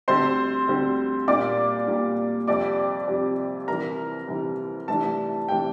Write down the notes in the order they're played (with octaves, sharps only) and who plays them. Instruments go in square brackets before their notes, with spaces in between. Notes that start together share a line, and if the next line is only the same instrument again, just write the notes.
[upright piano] D2 D3 G3 C4 C5 C6
D2 D3 G3 C4
A#2 G3 A#3 D5 D6
A#2 G3 A#3
F2 C3 G3 D5 D6
F2 C3 G3
C2 C3 E3 A#4 A#5
C2 C3 E3
C2 C3 E3 A3 D4 A5
C3 E3 A3 D4 G5